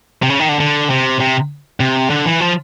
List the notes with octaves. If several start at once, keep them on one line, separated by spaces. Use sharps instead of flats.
C3
C#3
D#3
D3
D3
C3
C3
C3
D3
E3
F3